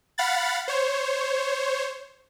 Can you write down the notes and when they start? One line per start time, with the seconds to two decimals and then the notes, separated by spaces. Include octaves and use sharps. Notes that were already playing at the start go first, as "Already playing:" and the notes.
0.18 F5 F#5 B5 A6
0.68 C5 C#5